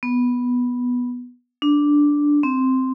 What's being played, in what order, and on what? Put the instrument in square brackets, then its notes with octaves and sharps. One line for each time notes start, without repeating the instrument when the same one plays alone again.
[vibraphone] B3
D4
C4